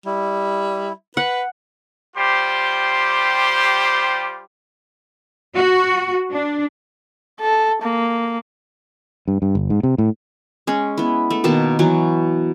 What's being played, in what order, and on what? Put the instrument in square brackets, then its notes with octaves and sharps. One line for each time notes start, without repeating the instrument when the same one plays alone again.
[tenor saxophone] G3 [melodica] E4
[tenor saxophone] B4 [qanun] F#5
[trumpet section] G3 F4 G4 C5 C6
[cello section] F#4
D4
[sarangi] A4
A#3
[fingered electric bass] G2
G2
G1
G#2
C3
A2
[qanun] G#3 C#4
B3 E4
A3
B2 D#3 A#3 A5
B2 E3 F#3